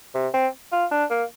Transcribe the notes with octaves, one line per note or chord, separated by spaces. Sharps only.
C3
C4
F4
D4
A#3